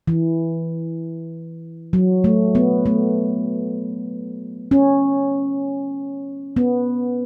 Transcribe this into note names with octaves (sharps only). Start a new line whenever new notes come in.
E3
F#3
A3
B3
A3
C#4
B3